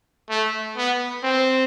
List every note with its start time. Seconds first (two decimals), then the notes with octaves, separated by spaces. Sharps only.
0.29 A3
0.76 B3
1.23 C4